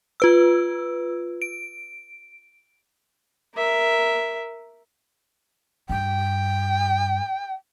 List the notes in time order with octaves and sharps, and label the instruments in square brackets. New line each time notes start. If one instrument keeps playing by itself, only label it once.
[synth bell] F4 B4 E6
D7
[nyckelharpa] A#4 E5
[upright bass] G2 [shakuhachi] G5